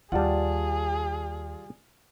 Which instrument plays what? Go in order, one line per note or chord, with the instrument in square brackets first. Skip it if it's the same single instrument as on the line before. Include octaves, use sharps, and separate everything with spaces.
[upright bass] D#2 [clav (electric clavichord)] G3 F#5 [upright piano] F4 D5 A5 [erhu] G#4